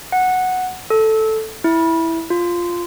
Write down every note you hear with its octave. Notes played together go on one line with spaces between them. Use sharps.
F#5
A4
E4
F4